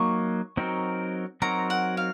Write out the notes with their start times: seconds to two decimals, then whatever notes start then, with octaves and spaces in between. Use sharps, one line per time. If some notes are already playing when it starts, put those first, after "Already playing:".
Already playing: F#3 A#3 D#4 C#6
0.57 F#3 C4 D#4 F#4 A#4
1.42 F#3 C4 D#4 F#4 A#4 A#5
1.70 F#5
1.97 F5